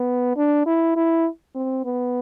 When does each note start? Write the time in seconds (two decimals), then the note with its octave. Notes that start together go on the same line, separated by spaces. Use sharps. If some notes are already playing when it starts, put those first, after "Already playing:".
Already playing: B3
0.36 D4
0.66 E4
0.96 E4
1.55 C4
1.85 B3